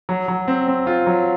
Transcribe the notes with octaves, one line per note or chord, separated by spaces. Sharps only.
F#3
F#3
C4
C4
F4
F#3